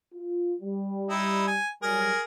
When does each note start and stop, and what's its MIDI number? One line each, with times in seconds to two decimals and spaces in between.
0.14 0.55 65
0.61 1.57 55
1.09 1.46 63
1.09 1.46 64
1.47 1.68 80
1.82 2.11 54
1.82 2.11 55
1.82 2.21 68
1.82 2.21 70